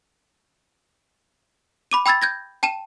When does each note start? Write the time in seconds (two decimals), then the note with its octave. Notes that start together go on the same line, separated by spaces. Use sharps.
1.91 B5 D6 D#7
2.06 G5 B5 E6 G#6 A6
2.22 G6 G#6 A#6
2.63 G5 A5 D#7 E7